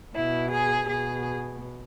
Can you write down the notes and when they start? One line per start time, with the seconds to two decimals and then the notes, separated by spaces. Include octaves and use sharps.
0.15 B2 E4
0.52 G#4
0.89 B2 G#4